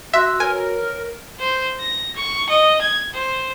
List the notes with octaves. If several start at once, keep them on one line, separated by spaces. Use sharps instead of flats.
F#4 E5 C6 E6 F#6 A#6
A#4 B4 C#5 G#5
C5
A#6
C#6
D#5
G#6
C5